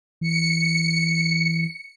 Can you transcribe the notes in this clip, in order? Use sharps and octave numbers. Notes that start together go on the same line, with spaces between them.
E3 C#7